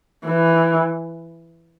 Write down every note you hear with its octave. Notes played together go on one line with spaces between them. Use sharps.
E3